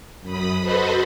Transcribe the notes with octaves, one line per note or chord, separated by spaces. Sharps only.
F#2 B5 D#6
F#4 A4 B4 C5 D#5 B5